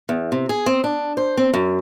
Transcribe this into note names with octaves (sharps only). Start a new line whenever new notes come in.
E2
C3
G#4
C4
D4
C5
C4
F#2